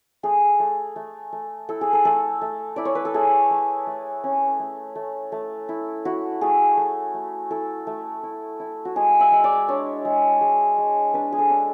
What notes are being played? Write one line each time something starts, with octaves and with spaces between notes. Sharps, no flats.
A3 G#4
A3
A3
A3
E4 A4
G#4
A4
A3 A4
A3
E4 D5
C#5
B4
A4
A3 G#4
A3
A3
C#4
A3
A3
A3
E4
E4 F#4
A3 G#4
A3
A3
E4 A4
A3
E4
E4
F#4
G#3 G#4
E5
G#3
D5
D4 C#5
G#3
G#3
G#3
D4 B4
G#4
A4
D4